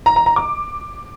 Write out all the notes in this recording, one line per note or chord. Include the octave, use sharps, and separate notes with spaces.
A#5
A#5
A#5
D6